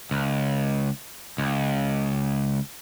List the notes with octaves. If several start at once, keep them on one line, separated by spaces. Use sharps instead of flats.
C#2
C#2